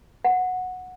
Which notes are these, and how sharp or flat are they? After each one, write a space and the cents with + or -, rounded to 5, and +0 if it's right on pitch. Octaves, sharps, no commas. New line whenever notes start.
F#5 -10